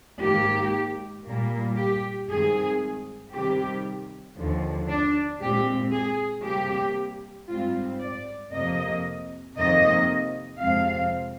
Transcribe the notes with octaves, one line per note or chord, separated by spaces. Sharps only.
G#2 D#3 A#3 G4
A#2 G3 A#3
G4
G2 D#3 G#3 C4 G#4
C3 D#3 G3 C4 G4
D#2 D3 F3
D4
A#2 G#3 C4 G4
G#4
C3 G3 A#3 G4
G#2 G3 C4 F4
D5
F2 C3 F3 A#3 D#5
F2 C3 D#3 A#3 D#5
F2 C3 F3 G#3 C4 F5